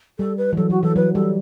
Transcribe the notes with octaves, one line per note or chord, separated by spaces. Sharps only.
G3 A4
B4
E3
F#3 A4
F#3 F#4
E3 A4
F#3 B4
G3 A4